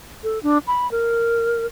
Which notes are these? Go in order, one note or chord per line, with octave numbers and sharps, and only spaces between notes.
A4
D4
B5
A#4